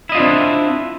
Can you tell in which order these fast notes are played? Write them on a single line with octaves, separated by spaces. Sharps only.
E4 D#5 F4 D4 C4